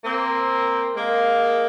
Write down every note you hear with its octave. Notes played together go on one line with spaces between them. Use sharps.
A#3 C4
G#3 A#3